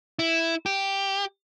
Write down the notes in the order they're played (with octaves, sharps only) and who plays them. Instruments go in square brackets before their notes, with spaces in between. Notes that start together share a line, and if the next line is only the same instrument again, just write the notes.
[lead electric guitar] E4
G4